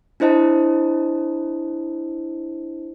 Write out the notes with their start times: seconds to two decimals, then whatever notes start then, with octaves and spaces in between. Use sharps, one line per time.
0.20 D4 E4 C5 D#5 A5